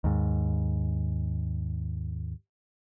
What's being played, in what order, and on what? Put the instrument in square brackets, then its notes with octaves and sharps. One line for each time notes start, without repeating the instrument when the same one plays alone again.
[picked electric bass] D#2 G#2